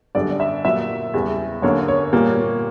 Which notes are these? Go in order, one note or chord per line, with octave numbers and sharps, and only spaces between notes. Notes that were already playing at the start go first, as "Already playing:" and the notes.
F#2 D3 G3 D5
E5
A#2 F#3 A#3 E5
E2 C#3 G3
F#2 D3 A#3 C#5
C#5
A#2 G3 A#3